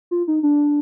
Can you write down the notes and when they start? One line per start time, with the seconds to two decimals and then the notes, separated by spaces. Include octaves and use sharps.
0.11 F4
0.28 D#4
0.43 D4